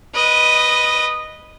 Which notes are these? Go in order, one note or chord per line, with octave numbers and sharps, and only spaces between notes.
B4 D#5